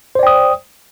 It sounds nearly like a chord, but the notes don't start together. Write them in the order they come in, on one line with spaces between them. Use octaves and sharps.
C5 D5 G5 D#6